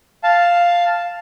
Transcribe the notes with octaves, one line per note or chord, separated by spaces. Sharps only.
F5 A5